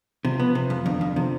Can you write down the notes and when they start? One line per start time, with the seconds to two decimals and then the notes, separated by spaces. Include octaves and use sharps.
0.25 C3 F3
0.40 B3
0.55 C3
0.70 F2
0.86 F2 D3
1.00 F2 D3
1.16 C3 F3